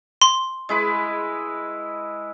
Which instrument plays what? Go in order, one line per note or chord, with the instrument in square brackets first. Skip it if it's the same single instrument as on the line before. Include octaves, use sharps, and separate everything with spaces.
[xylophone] C6
[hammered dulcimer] G#3 E4 B4